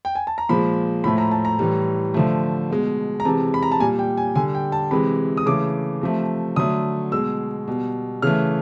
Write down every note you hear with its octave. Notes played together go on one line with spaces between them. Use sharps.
G5
G#5
A5
A#5
A#2 F3 G#3 B5
A2 F3 A3 B5
A#5
A5
A#5
A2 E3 G3
D3 F3 A3
B2 G#3
A#5
C3 E3 G#3 A5
B5
A#5
A5
A#2 G3 G#5
G5
G#5
D3 G3 G#5
G5
A5
C3 E3 G#3 B5
D#6
C#3 E3 A3 D6
C3 F3 A3
D3 F#3 A3 D#6
B2 G#3 E6
B2 G3
C#3 E3 A3 F6